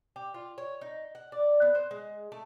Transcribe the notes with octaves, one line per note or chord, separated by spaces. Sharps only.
G4
F4
C#5
D#4
F#5
D5
B3
C5
G#3
A3